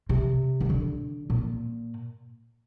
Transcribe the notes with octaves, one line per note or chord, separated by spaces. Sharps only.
C3
D#3
D3
A#2